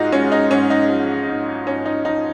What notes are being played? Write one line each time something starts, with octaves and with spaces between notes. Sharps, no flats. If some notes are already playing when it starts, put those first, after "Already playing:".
Already playing: G#2 G#3 D#4 F4 F#4 G#4
G#3 C#4
D#4
G#2 C#4
D#4
F3
G#2
G#2 C#4
D#4
F3 D#4